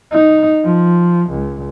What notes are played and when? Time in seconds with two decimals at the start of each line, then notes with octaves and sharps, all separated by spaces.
0.12 D#4
0.65 F3
1.31 C#2